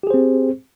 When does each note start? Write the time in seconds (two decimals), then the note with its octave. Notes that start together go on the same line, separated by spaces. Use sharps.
0.03 G4
0.07 G#4
0.10 C5
0.14 C4